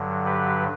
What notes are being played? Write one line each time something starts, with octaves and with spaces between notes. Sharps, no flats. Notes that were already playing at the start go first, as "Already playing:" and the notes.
Already playing: G2 D3 F#3
G4 B4